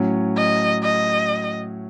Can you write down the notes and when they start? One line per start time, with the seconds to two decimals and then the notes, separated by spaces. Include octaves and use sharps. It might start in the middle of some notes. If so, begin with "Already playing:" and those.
Already playing: A2 F#3 C#4
0.37 D#5
0.83 D#5